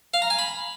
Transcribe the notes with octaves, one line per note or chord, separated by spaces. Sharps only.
F5
A#5
G#5
B5